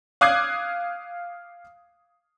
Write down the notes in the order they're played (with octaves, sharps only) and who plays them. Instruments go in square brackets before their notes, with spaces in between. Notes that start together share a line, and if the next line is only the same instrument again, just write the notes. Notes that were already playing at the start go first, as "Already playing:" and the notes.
[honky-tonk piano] F5 D6 D#6 F#6 G#6 C7